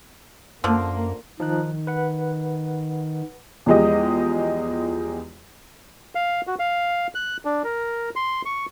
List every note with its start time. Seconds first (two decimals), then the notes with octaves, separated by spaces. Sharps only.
0.64 F#2 D3 F3 A#3
1.40 D#3 F3 D#4 F#6
1.87 B4 F#5
3.66 E2 F3 G#3 G4 D#5
6.15 F5
6.47 F#4
6.59 F5
7.15 F#6
7.45 D4
7.64 A#4
8.16 C6
8.45 C#6